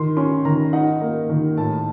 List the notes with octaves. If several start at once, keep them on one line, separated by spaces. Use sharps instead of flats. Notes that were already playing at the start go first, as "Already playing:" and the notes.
Already playing: D#3 C6
C#4 C6
D#3 A#5
D#4 F#5
A#3
D#3
A2 A5